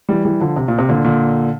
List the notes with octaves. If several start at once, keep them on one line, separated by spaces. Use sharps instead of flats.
E3 G3
E3 G3
D3 F3
C3
A#2
C3
A#2 D3
A#2 D3